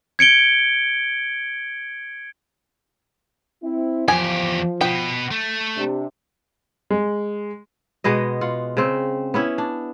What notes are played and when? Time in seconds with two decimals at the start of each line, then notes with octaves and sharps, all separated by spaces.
0.19 G#6 C#7 D7 G7
3.62 C4 E4
4.08 E2 F3 G4 G#5
4.81 B2 B3 G5
5.31 A3
5.76 C3 D4
6.90 G#3
8.04 B2 G#3 B3 D#5
8.41 F4 F#5
8.77 C#3 C4
9.34 B3 C#4 E4
9.58 D4